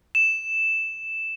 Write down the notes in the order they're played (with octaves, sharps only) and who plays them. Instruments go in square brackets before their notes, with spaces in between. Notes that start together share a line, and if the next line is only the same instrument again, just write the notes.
[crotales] E7